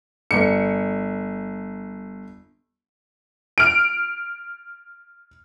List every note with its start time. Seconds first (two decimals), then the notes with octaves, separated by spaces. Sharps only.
0.31 G1 C#7
3.58 F6 D7